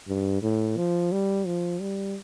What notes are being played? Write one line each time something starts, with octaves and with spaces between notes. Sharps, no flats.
G2
A2
F3
G3
F3
G3